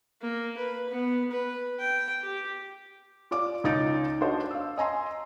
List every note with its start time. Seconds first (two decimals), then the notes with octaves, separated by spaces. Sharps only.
0.22 A#3
0.58 B4
0.90 B3
1.31 B4
1.79 G5
2.23 G4
3.31 F4 D5 D6
3.64 C#2 D#4 A6 D7
4.21 D4 F#4 C5 D#5
4.51 F5 E6
4.78 D#5 G#5 A#5 C6